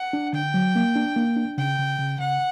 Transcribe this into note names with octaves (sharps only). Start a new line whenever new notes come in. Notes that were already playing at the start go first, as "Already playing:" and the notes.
Already playing: F#5
D4
D3 G5
F#3
A#3
D4
A#3
D4
C#3 G5
C#3
C#3
C#3 F#5